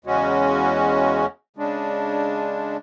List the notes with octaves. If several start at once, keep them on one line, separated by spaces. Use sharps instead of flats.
E2 C#3 G#3 C#4 F#4
C#3 G#3 D4